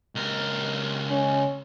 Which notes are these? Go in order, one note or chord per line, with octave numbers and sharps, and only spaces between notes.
C#2 A#4
C#4